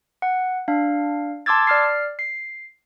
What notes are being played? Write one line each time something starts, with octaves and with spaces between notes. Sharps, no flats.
F#5
D4 F5
A5 C6 D6 E6 G#6 A6
D5 F6 C7
C7